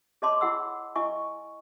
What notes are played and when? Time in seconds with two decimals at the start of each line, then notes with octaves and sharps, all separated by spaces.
0.22 G#4 C#5 D#5 A5 C6 D6
0.41 E4 G#4 F#5 B5 E6
0.96 E4 D#5 G#5 C#6